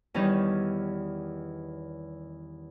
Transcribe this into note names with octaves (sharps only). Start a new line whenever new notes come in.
E2 D#3 G3 C#4 D#4